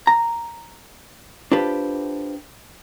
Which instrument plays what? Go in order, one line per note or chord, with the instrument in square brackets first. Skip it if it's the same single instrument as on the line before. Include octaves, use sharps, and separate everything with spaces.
[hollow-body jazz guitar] A#5
D4 F4 G4 A4 B4 C5